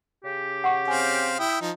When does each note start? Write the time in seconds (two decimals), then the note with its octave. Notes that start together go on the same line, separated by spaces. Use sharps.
0.24 C#3 G4
0.64 F#5 C#6
0.88 C4 F5 G#5
1.39 E4 G5 D#6
1.61 F3 D#4